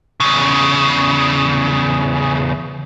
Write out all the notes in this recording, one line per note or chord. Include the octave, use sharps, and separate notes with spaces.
E2 C#3